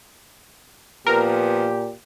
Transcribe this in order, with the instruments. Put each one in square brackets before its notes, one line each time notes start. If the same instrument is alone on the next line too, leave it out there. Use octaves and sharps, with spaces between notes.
[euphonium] A#2 [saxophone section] F3 B3 [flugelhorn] G4 [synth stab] A#4